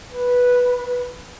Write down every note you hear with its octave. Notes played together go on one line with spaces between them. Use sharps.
B4